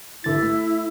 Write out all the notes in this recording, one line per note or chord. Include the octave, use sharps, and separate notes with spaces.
G#1 D3 E4 A6
A3